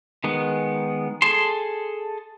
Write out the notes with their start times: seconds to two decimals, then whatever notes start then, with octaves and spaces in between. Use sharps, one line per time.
0.24 D#3 G#3 B3
1.22 G#4 A4 A5 C6